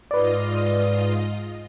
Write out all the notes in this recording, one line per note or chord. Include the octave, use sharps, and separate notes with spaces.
G#2 F4 B4 D5 D#5